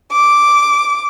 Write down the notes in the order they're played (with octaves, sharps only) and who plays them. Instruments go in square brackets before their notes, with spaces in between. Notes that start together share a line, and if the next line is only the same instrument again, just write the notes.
[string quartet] D6